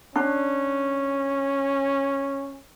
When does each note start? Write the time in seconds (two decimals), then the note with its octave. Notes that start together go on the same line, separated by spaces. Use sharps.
0.16 C#4 D4